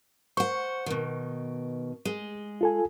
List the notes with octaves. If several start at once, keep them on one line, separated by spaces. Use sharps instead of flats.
C5 F#5 C#6
B2 D#3
G#3
F4 A4 G#5